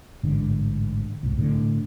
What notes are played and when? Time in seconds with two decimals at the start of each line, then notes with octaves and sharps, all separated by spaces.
0.23 A1 G#2 D3
1.23 C2 G#2
1.38 A2 D3